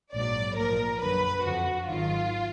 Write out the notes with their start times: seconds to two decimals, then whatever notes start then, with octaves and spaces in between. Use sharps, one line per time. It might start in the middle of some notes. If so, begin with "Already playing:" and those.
0.14 A#1 G#2 F#3 D5
0.57 A#1 A#2 F3 A#4
1.01 F#2 D3 F#3 B4
1.44 F2 D3 F3 F#4
1.88 G#1 G#2 D#3 F#3 F4